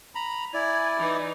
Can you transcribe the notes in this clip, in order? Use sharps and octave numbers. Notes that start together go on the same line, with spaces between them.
A#5 B5
E4 D5 G#5
E3 D#4